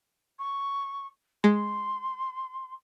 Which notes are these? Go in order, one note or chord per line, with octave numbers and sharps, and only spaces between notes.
C#6
G#3 C6